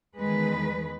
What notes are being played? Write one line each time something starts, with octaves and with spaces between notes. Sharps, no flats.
E2 D#3 G#3 B4